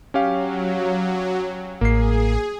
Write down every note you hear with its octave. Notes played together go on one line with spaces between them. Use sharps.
F#3 C#4 G4 F5
A1 A#3 G#4 C7